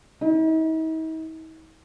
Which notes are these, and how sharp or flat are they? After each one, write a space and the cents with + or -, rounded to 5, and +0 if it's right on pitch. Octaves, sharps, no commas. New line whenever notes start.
D#4 +45